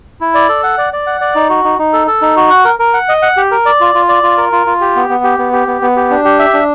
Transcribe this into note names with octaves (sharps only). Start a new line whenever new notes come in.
E4
D5
A4
F#5
D5
D5
F#5
D5
D#4
F#4
D#4
D#4
A4
A4
D#4
F#4
F#5
A#4
A#4
F#5
D#5
F#5
G4
A#4
D5
F4
F4
D5
F4
A#4
F4
F4
G4
B3
B3
G4
B3
G4
B3
B3
G4
D4
G4
E5
D4